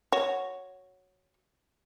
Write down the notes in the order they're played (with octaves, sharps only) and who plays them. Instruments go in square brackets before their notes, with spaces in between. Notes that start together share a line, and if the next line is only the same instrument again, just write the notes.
[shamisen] F#4 C#5